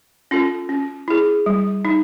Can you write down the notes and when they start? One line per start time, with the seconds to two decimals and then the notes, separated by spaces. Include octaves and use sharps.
0.31 C#4 F4 A4
0.69 C#4
1.08 E4 G#4
1.46 G3
1.85 D#4